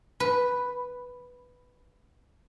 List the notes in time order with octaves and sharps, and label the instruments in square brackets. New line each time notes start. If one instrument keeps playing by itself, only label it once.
[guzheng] B4